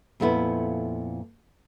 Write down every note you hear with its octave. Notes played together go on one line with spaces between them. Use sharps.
F2 A#2 A3 B3 E4